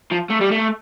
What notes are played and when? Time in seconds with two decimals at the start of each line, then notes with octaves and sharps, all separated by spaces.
0.11 F3
0.30 A3
0.41 G3
0.51 A3